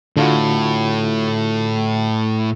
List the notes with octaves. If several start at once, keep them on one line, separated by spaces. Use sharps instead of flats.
A2 D3 F4 F#4